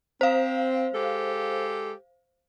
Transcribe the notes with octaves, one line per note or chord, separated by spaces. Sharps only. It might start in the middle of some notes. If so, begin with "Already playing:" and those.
C4 C5 F5
G#3 G4 A4